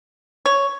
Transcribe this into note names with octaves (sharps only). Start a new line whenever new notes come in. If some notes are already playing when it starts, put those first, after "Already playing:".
C#5